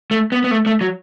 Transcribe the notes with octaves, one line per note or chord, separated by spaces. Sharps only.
A3
B3
B3
A3
A3
F#3